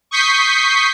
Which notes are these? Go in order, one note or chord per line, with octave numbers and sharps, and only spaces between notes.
C#6 D#6 G6 B6 C7